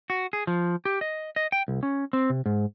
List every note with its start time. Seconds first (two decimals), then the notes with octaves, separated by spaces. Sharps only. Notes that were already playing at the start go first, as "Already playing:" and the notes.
0.10 F#4
0.33 G#4
0.47 F3
0.85 G4
1.01 D#5
1.36 D#5
1.52 G5
1.68 C2
1.83 C#4
2.13 C4
2.30 C3
2.46 G#2